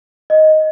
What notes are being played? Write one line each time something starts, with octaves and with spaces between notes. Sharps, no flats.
D#5